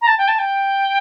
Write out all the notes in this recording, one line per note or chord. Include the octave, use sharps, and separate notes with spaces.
A#5
A5
G5
A5
G5